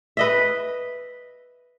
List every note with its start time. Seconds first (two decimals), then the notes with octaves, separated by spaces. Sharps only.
0.17 B4 D#5 E5